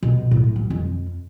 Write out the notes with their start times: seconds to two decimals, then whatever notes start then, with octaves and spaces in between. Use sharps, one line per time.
0.03 B2
0.31 A2
0.56 G3
0.70 F2